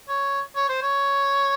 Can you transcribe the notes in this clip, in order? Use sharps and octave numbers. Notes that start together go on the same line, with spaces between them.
C#5
C#5
C5
C#5